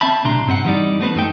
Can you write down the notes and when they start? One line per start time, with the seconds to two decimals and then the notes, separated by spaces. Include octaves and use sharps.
0.01 C4 E5 A5 B5
0.24 B1 A2 C3 D4 A#5 C6
0.47 G2 C4 D#5 F#5
0.64 E3 G3 D#4 D5
1.00 A3 B3 C4 B4
1.15 F#2 A3 D#4 G5